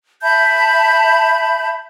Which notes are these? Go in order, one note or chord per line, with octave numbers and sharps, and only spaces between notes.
E5 A5 B5 G6